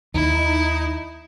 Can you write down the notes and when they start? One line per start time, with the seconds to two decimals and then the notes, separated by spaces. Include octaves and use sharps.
0.14 D#2 D#3 D#4 E4